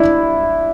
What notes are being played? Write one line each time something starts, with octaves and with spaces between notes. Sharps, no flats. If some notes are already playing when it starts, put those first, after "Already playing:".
Already playing: D4 E4